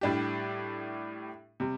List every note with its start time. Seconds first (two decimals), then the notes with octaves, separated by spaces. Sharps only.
0.01 A2 G3 D4 G4
1.60 C3 G3